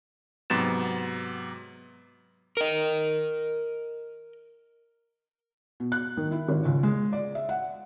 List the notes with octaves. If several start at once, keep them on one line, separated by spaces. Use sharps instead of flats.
G#2 C3 F#3 B3 A6 E7
A#4 D#5
B2
F#6
D#3
E4
G#1
C#2
G#3
D5
E5
F#5